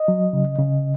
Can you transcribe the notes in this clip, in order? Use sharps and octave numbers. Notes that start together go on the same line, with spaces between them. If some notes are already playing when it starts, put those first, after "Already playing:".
Already playing: D#5
F#3
C#3
C#3